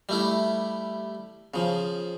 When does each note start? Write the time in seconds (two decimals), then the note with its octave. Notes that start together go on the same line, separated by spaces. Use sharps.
0.09 G3 A3 E4
1.54 C#3 F3